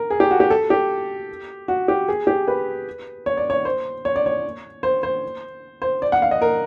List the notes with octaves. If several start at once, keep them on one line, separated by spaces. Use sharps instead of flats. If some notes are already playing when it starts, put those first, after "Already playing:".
Already playing: A#4
G#4
G4
F#4
G4
A4
G4
F#4
G4
G#4
G4
B4
C#5
D5
C#5
C5
C#5
D5
C#5
C5
C5
C5
D5
F#5
F5
D#5
A#4